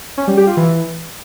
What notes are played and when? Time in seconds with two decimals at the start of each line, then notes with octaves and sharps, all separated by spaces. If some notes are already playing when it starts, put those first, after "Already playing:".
0.18 C#4
0.27 G3
0.37 G4
0.47 F4
0.57 E3